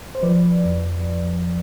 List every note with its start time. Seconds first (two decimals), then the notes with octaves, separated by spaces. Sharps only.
0.15 C5
0.23 F3 B4 D5
0.65 F2